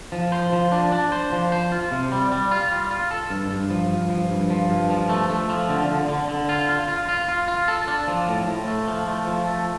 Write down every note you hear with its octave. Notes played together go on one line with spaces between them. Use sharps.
F3
C5
F3
D4
D4
C5
F3
C5
F4
C3
G3
G3
F4
G3
F4
A4
G2
G2
F3
G2
F3
G2
F3
G2
F3
A3
A3
F3
D3
D3
D3
D3
F4
F4
F4
F4
F4
F4
A4
D4
F3
A2
A2
A3
F3
A3
F3
A3